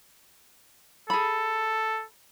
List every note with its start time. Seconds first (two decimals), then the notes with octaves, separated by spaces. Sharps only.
1.10 G#4 A4 B5